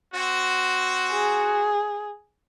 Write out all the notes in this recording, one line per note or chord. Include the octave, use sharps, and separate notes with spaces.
C4 F#4
G#4